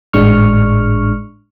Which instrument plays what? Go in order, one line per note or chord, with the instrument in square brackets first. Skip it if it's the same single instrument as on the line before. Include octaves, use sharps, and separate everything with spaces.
[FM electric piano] G#1 A2 G#3 D4 C#6 F6